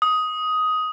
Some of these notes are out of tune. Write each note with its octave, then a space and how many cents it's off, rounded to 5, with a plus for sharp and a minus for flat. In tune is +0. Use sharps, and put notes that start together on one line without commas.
D#6 +10